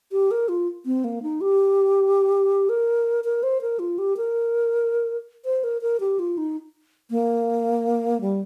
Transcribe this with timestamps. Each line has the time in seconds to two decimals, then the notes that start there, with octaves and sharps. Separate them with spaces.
0.12 G4
0.31 A#4
0.49 F4
0.86 C4
1.04 A#3
1.23 D#4
1.41 G4
2.69 A#4
3.24 A#4
3.43 C5
3.61 A#4
3.79 F4
3.98 G4
4.17 A#4
5.45 C5
5.64 A#4
5.82 A#4
6.00 G4
6.19 F4
6.38 D#4
7.11 A#3
8.21 G3